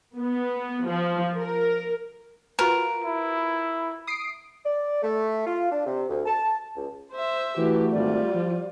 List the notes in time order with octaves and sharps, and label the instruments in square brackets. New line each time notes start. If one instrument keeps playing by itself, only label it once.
[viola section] B3
F3
A#4
[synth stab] F4 F#4 B4 [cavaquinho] A#4
[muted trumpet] E4
[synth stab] D#6 C7 D7
[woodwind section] D5
A3
F4
D4
C3
D2
A5
C#2
[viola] C5 E5
[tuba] E3 [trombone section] A3 F#4 [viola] G4
[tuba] G#1 [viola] G3 F4 [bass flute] D5
[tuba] F3